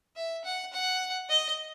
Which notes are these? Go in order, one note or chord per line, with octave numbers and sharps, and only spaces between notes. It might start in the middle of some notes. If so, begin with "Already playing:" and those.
E5
F#5
F#5
D#5